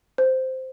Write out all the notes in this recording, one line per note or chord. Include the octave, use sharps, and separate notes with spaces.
C5